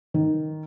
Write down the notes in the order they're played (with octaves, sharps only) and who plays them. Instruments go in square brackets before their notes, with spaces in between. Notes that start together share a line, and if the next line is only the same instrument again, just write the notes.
[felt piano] D#3